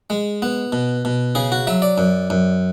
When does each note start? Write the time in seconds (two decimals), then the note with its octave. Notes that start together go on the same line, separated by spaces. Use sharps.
0.10 G#3
0.42 B3
0.72 B2
1.05 B2
1.35 C#3 G#4
1.52 F#4
1.67 F#3 E5
1.82 D5
1.98 F#2
2.30 F#2